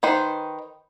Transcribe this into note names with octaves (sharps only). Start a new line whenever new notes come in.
D#3 B4 C5